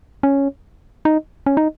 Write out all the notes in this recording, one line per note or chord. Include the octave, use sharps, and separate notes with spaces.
C#4
D#4
C#4
D#4